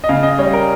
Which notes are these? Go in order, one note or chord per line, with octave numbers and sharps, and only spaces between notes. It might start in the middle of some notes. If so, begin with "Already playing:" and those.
D#5
C#3 F5
D#5
G3 C#5
A#4